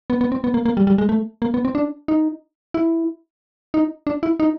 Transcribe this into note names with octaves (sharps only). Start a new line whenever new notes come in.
B3
B3
C4
B3
A#3
A#3
G3
G3
G#3
A3
A#3
B3
C4
D4
D#4
E4
D#4
D4
E4
D#4